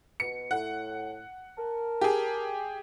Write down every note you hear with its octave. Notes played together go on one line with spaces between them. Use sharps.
B2 C#7
A2 F#5
A#4 A5
G4 G#4